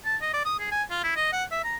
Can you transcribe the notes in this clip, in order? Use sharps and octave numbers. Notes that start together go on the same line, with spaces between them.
A5
D#5
D5
D#6
G#4
G#5
F4
E4
D#5
F#5
E5
A#5